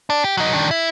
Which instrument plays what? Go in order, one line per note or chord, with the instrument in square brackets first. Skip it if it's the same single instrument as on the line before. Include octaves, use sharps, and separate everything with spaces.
[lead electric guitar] D4
G4
F#3 D#4
D#3 D4
E4